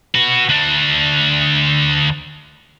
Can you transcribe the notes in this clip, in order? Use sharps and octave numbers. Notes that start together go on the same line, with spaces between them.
F#4 B4
D2 D4